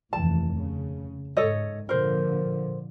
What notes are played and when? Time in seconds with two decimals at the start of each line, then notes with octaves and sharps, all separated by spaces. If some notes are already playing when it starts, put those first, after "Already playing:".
0.13 F1 D#2 E3 A5
0.56 C#3
1.37 G#2 A4 C#5 D#5
1.89 A#2 D3 F3 A#4 C5